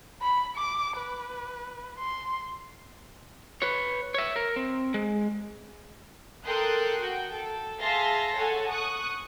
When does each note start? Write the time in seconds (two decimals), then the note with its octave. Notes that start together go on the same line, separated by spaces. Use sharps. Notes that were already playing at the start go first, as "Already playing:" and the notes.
0.22 B5
0.56 D6
0.97 B4
1.98 C6
3.62 B4 C#5
4.14 C#5 E5
4.36 A#4
4.56 C4
4.94 G#3
6.44 A4 A#4 G5 C6 D#6 F#6
6.99 F#4 G5
7.33 A4
7.81 G#4 E5 F5 A5 C6 A#6
8.36 A4 C#5 F#5 G#5
8.69 C#6 D#6 F#6